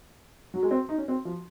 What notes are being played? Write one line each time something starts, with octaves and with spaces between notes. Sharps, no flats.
F#3
G#3
C4
D#4
C#4
C4
F3